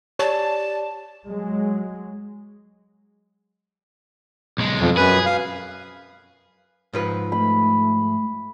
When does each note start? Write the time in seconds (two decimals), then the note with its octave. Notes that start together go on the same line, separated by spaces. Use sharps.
0.19 G4 C#5 D5 A5
1.27 F#3 G#3
4.58 B1 G#3
4.80 F2
4.97 F#2 G#4 B4
5.26 F5
6.93 G#2 F3 B4
7.32 A3 B5